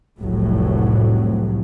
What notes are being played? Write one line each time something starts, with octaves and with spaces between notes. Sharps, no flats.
F1 C2 A2 F#3